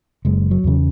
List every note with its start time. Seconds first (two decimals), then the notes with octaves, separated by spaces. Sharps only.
0.25 F#1 G#3
0.51 F#3
0.64 E2 C#3